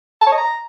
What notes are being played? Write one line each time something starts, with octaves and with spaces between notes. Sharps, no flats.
A5
C#5
D#5
A#5